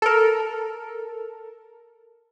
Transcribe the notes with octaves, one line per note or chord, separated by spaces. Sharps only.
A4 A#4